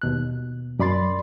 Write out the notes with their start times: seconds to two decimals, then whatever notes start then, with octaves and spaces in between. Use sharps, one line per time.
0.02 D#2 B2 F#6
0.79 F#2 D5 B5 C6 A6